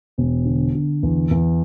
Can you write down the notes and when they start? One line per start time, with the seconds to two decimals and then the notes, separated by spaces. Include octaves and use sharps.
0.18 E1
0.45 D3
0.75 D3
1.03 E2
1.31 E2